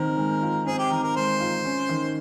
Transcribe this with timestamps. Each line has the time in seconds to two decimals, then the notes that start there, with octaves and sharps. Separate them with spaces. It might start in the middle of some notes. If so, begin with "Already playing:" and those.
Already playing: D#3 C4 A#4
0.17 G#3
0.42 F4
0.66 C4 G#4
0.78 G4
0.91 D#3 A#4
1.04 A#4
1.16 G#3 C5
1.40 F4
1.65 C#4
1.89 D#3